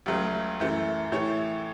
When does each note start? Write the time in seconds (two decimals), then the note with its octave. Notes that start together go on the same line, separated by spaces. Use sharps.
0.06 C#2 C#3 F#3 A3
0.60 F#2 E3 A3
1.12 A2 E3 A3 C#5